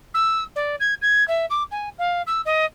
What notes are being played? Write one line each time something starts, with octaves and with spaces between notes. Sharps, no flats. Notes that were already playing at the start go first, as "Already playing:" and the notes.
E6
D5
G#6
G#6
E5
D6
G#5
F5
E6
D#5